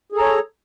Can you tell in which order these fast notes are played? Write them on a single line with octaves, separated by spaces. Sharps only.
G#4 A4 A#5 C#5